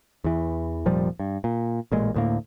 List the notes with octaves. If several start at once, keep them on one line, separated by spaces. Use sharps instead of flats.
E2 E3
F1 A#2 F3 G3
G2
A#2
A1 A#2 G#3
D2 A2 A#3